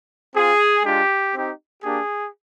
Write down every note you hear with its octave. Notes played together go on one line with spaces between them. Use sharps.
C4 F4 G#4
G#3 D4 F4 G4
C4 D#4 G4
A#3 D4 G4 G#4